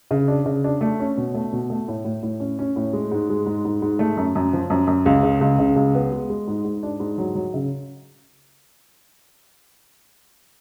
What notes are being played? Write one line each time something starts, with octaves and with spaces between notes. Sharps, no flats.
C#3
D4
C#3
D4
A3
C#4
B2
A3
B2
A3
A2
A2
A2
C#4
C#4
A2
G#3
G#2
G#3
G#2
G#2
G#2
A3
F#2
F#2
F3
F#2
F#2
C#2
C#3
C#2
C#3
C#2
B3
G#3
G#3
G#2
G#2
D4
G#2
F#3
F#3
C#3